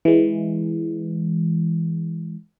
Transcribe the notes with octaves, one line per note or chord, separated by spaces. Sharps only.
E3 G#3